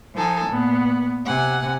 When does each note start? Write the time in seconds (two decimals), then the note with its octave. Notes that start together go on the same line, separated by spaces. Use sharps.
0.15 F3 D#4 A4 G#5
0.47 A#2 B3
1.26 C3 F#5 G#5